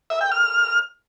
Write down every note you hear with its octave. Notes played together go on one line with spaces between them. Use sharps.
E5
G5
F6